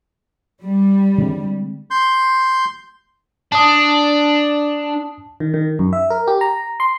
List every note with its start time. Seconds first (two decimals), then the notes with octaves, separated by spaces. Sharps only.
0.63 G3
1.18 D3 G#3 C4
1.91 C6 G6
3.52 D4 A5 D#6
5.40 D#3
5.54 D#3
5.79 F#2
5.93 E5
6.10 A#4
6.28 G4
6.41 A#5
6.80 C6